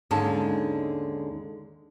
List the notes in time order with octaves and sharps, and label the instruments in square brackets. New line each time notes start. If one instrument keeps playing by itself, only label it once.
[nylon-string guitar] D#2 G#2 D3 G#3 C#4 A5